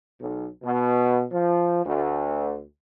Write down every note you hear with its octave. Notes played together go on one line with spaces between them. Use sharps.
B1
B2
F3
D2